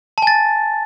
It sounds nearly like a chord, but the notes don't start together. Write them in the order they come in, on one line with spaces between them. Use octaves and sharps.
A5 G#5 A6